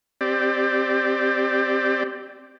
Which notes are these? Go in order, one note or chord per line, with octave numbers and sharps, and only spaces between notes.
C4 G4 D5